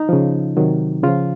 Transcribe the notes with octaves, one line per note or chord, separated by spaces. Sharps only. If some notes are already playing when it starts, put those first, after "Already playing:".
Already playing: D#4
C#3 F3
C3 D#3 F#3
C#3 F3 F4